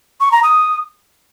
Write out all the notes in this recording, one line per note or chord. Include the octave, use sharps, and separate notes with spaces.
C#6
A#5
D#6